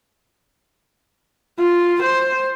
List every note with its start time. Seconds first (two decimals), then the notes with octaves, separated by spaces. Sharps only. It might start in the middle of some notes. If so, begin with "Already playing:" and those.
1.59 F4
2.02 C5